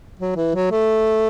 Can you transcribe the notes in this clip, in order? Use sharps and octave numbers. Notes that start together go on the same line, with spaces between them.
F#3
E3
F#3
A3